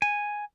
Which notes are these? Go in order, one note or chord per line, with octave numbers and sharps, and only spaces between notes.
G#5